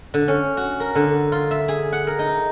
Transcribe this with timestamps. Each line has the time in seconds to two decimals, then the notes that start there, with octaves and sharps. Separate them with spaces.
0.14 D3
0.28 C#4
0.57 F#4
0.80 A#4
0.95 D3
1.32 F4
1.51 E5
1.68 G#4
1.93 F#5
2.07 A#4
2.19 D#4